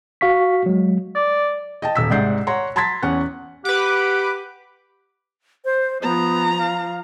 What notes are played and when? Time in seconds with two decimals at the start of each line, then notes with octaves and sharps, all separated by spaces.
0.21 F#4 F5 C#6 B6
0.66 F#3 G#3
1.15 D5
1.82 D#5 G5 A5
1.95 D#1 E6 B6
2.10 C2 G#2 D5 F#5 G6 C7
2.47 C#5 F#5 A#5 C6
2.76 A5 A#5 C6 G#6 A6 B6
3.02 E2 C#4 F#5 F#6
3.65 G4 B4 F#5 D6
5.65 C5
6.03 F3 B3 A#5
6.58 F5